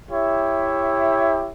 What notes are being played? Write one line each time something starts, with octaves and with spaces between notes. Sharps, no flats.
E4 G4 C#5 E5